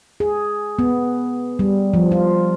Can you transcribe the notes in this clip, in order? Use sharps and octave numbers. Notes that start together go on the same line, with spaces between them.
G#4
B3
G3
F3
F4